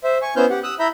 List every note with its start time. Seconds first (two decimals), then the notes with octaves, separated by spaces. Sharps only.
0.04 C5 E5
0.22 G#5 C#6
0.36 B3 C#4 E4 C5 F6 G6
0.50 G4 F#5
0.63 D#6 E6 F#6
0.80 E4 E5 A#5 B5 G6